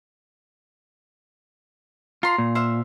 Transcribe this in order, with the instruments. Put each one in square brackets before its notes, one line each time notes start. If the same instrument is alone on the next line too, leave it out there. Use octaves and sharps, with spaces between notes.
[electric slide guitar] F4 [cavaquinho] A#5 C6
[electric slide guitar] A#2
[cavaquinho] C5 E5 F5